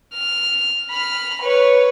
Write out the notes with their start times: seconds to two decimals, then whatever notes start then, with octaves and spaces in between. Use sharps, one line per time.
0.14 F6
0.91 B5 F6
1.42 B4 C#5